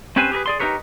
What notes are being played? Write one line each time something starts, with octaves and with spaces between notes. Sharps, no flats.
C4 C#4 G4 B4 C5 G#5
G4 G#4 A#4 B4
G#4 D5 C6
D#4 F4 G4 A#4 B4 C#5